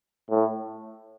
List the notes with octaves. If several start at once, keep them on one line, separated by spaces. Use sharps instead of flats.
A2